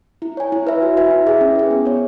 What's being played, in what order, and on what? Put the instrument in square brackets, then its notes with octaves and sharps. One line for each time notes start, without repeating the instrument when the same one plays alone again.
[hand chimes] E4
C#5 G#5
E4
B4 E5
F#4
B4 E5 G#5
E4
G#4 E5 G#5
C#4
G#4 B4
B3
G#4 C#5